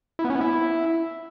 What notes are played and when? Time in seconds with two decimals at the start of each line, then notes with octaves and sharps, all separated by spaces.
0.19 E4
0.24 B3
0.30 C#4
0.35 B3
0.41 E4